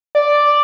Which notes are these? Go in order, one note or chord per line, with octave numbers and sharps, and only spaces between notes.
D5